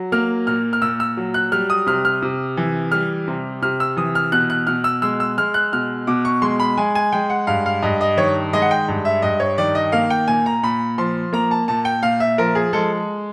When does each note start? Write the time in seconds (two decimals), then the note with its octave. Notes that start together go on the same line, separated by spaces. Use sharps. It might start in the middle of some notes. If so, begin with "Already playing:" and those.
Already playing: F#3
0.12 A#3 F6
0.47 A#2 F6
0.73 F6
0.82 A#2 E6
1.00 E6
1.17 F#3
1.34 F#6
1.52 G3 F6
1.70 D#6
1.86 C3 F6
2.05 F6
2.22 C3
2.57 E3
2.92 G3 F6
3.28 C3
3.62 C3 F6
3.80 E6
3.97 E3 D#6
4.15 F6
4.32 B2 F#6
4.50 F#6
4.67 B2 F6
4.84 E6
5.02 G#3 E6
5.20 E6
5.38 G#3 F6
5.54 F#6
5.73 B2 F6
6.07 B2 D6
6.25 C#6
6.42 G#3 C6
6.60 B5
6.78 G#3 G#5
6.95 G#5
7.12 G#3 G5
7.30 F#5
7.47 G2 F5
7.66 F5
7.82 G2 D#5
8.01 D#5
8.17 D#3 C#5
8.53 G#3 D#5
8.62 F#5
8.71 G5
8.88 G2
9.05 E5
9.22 G2 D#5
9.40 C#5
9.58 D#3 D5
9.75 D#5
9.92 A#3 F5
10.10 G5
10.28 A#2 G#5
10.46 A#5
10.63 A#2 B5
10.98 F3 C6
11.33 A#3 A#5
11.51 A5
11.68 A#2 A5
11.85 G5
12.03 A#2 F5
12.20 E5
12.38 F3 A#4
12.55 G#4
12.73 G#3 A4